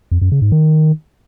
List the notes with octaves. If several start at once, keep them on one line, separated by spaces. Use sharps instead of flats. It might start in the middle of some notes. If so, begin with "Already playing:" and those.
F2
F#2
C#3
G#2
D#3